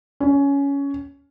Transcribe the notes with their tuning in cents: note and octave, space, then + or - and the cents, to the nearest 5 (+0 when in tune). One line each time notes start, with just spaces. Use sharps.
C#4 +15